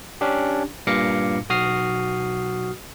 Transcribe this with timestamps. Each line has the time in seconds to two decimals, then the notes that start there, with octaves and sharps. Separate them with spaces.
0.21 C#4 D4 G4
0.87 G2 A#2 F5 D6 A#6 C#7
1.50 B1 F#4 D#6 F6 C7